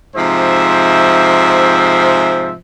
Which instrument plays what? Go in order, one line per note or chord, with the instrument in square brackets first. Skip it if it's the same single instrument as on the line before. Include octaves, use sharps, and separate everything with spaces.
[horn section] G#2 C3 F3 C5 E5